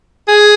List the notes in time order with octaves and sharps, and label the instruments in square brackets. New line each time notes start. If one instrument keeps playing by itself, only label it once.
[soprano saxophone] G#4